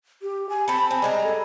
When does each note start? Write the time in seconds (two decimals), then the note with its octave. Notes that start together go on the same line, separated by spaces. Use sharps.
0.22 G4
0.50 G#5
0.68 C4 A4 B5
0.91 C4 G#5
1.02 G3 G#3 A#5
1.24 A4